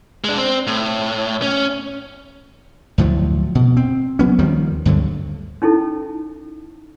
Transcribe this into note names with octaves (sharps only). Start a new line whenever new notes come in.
G#3 D4
C4
A2
C#4
D2 A2 F3 F#3
B2
C4
F#3 B3 C#4
D#2 D#3 F3 G3
D2 G2 D3 F#3
C#4 D#4 E4 A4